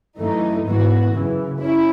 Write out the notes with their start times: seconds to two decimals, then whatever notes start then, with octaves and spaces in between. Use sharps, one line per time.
0.18 F#2 E3 A3 D#4
0.65 G#2 E3 B3 F#4
1.13 F#2 C#3 E3
1.60 C#4 E4